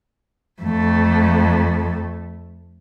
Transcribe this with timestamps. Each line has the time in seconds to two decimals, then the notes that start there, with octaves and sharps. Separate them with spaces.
0.62 F2 A3